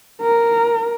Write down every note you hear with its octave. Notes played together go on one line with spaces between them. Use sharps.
A#4